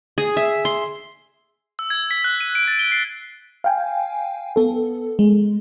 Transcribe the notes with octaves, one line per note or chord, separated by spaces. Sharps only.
G#4
E5
C6
E6
G#6
B6
F#6
D#7
D7
A6
G7
C7
F5 G5 G#5
B3 A4
G#3